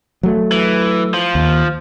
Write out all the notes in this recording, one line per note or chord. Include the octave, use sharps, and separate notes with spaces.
F#3 A3
E3
F3
D#2